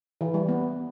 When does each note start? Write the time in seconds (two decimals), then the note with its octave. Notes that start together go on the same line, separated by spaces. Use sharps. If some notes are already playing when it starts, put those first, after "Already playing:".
0.21 E3
0.34 G3
0.49 B3